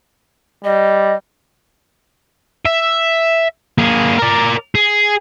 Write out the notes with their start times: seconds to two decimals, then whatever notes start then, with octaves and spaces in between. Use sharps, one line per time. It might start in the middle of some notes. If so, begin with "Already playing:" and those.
0.64 G3 D#5
2.66 E5
3.78 A#3 G#4
4.19 A#4 D5
4.75 G#4